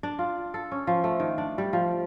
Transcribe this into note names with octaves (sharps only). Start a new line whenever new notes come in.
D4
F4
A4
C#4
F3
A3
D#3
D4
G3
F3